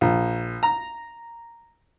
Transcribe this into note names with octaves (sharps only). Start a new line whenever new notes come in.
A#1
A#5